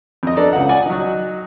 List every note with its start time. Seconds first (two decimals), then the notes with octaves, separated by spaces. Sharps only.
0.23 F2 D#5
0.37 B3 D4 A4 D5 A#5
0.53 C#2 F4 F#5
0.69 D5 F#5 G#5
0.86 F#3 D#4